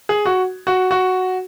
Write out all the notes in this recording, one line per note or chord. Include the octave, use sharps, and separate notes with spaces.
G#4
F#4
F#4
F#4